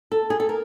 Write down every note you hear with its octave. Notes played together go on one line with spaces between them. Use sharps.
A4
G#4
A4
A#4